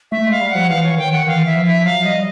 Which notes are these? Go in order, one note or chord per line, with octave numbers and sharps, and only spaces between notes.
A3 E5
G#3 F5
G3
F3 F#5
E3 F5
C#5
D#3 G5
F#5
E3 F5
E5
F3
E5
F#3 F5
G3 D#5